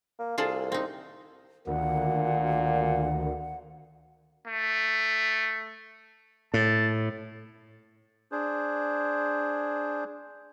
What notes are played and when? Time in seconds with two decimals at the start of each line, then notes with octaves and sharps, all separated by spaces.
0.19 A#3
0.38 C2 F4 G#4 A4
0.72 C4 D#4
1.67 D2 A#2 D#3 F#5
4.47 A3
6.54 A2 A5
8.32 D4 G#4 C5